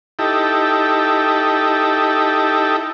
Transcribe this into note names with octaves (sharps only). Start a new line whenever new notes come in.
D#4 E4 G4 A4